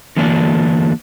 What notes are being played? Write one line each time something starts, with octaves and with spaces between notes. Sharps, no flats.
D3 E3 F#3 A#3 D4